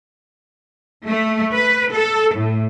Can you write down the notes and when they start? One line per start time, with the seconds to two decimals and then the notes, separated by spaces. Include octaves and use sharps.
1.05 A3
1.53 B4
1.93 A4
2.35 A2